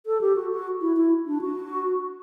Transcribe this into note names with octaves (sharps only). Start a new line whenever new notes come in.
A4
G4
F#4
F#4
E4
E4
D4
F#4